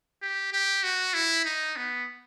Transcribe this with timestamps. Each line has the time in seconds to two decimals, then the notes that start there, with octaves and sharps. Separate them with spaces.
0.22 G4
0.52 G4
0.83 F#4
1.14 E4
1.45 D#4
1.77 B3